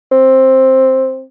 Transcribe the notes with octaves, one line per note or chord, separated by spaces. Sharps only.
C4